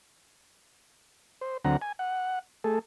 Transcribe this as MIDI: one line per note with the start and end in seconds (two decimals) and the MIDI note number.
1.41 1.57 72
1.65 1.77 38
1.65 1.77 50
1.65 1.77 54
1.65 1.77 60
1.65 1.77 78
1.65 1.77 82
1.81 1.92 80
1.99 2.39 78
2.64 2.79 57
2.64 2.79 68
2.64 2.79 69